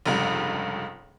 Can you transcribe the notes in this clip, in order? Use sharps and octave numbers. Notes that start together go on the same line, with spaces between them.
F1 C#2 G2